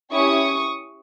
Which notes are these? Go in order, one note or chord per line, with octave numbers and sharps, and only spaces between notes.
C#4 E4 G4 C#6 D#6